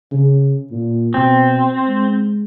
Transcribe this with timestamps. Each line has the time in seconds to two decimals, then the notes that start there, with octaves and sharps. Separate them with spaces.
0.12 C#3
0.71 A#2
1.14 B2 C4
1.87 G#3